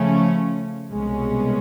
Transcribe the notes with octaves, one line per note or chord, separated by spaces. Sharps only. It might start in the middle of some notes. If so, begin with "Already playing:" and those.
Already playing: C#3 F3 A3 C#4
C2 B2 G#3 C#4